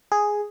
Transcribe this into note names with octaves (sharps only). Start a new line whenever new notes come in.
G#4